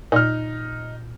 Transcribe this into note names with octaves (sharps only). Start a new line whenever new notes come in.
A#2 D#4 F6